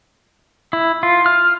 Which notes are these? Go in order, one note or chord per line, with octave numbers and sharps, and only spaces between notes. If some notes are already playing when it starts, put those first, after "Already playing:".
E4
F4
F6